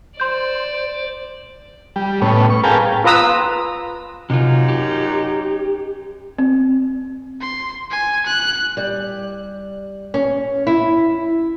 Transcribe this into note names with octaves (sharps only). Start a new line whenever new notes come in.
C5 D5 C6 G6
G3
A2 B3 C#4
C#6
G#4 A#4 B4 F5 G5 A5
F4 B4 A#5 D#6 E6
F#2 C3 D#4 F4
G4
C4
C6
G#5
F#6
G3
C#4
E4